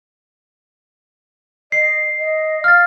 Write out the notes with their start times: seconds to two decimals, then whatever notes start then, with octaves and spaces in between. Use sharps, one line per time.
1.72 D#5 C7
2.19 D#5
2.64 F5 F6 A6